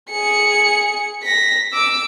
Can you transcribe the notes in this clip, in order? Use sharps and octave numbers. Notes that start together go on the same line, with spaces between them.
G#4 C#7
A#6 B6
D6 E6